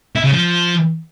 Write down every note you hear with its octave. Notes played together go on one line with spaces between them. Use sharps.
E4
C#3
F3